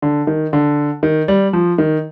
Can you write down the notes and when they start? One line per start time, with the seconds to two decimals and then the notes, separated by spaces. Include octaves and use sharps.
0.02 D3
0.27 D#3
0.53 D3
1.03 D#3
1.28 G3
1.53 F3
1.78 D#3